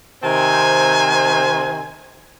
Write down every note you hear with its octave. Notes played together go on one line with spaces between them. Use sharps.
C3 D#3 C4 C5 G#5